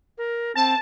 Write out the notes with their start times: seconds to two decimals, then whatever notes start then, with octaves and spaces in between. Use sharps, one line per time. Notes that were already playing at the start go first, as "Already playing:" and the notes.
0.18 A#4
0.55 C4 A5